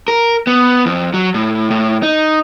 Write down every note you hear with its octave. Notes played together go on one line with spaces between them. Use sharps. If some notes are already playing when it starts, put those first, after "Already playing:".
A#4
B3
F2
F#3
A2
A2
D#4